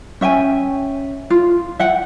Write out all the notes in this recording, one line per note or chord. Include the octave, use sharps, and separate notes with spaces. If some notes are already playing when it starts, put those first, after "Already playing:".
C#4 E5 G5 G#5
F4
E5 F#5 G5